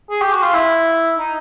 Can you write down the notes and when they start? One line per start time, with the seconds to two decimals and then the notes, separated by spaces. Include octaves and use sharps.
0.10 G#4
0.22 G4
0.32 F#4
0.43 F4
0.53 E4
1.18 D#4